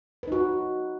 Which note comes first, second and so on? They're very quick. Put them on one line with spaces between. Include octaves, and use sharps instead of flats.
B4 D#4 F#4